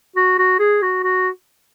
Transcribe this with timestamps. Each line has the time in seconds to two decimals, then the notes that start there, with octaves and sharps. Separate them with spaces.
0.16 F#4
0.39 F#4
0.59 G#4
0.82 F#4
1.03 F#4